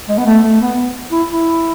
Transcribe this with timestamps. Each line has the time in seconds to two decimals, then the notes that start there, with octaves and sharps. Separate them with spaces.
0.09 G#3
0.18 B3
0.26 A3
0.43 A3
0.60 B3
1.12 E4
1.31 E4